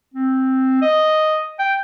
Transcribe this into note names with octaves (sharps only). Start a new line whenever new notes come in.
C4
D#5
G5